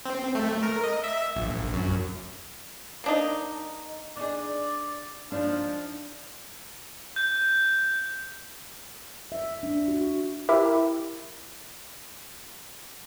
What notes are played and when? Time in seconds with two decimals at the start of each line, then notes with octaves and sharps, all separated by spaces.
0.05 C4
0.35 A3
0.63 A#4
0.84 D#5
1.04 E5
1.36 A#1
1.74 F#2
3.04 A#3 D4 D#4
4.17 D4 D#4 G#4 D5
5.32 F3 D4 D#4
7.16 G6
9.32 E5
9.63 D4
9.88 F#4
10.49 E4 G4 A#4 E5